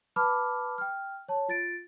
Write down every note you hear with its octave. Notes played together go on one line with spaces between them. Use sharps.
B4 A5 B5 D6 F6
G5 F6
C#5 A5
F4 A6 D7